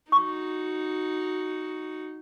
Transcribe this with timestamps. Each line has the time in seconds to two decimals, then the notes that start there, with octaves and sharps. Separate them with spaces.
0.12 D#4 F#4 C#6